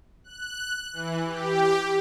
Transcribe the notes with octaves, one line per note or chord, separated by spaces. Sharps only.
F#6
E3
G4